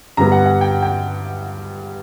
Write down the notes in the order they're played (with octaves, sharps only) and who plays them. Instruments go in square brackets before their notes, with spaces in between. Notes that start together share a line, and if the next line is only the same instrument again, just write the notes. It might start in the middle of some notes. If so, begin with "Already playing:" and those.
[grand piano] G2 D3 G3 B3 A#5
F#5
F#5
G5
G5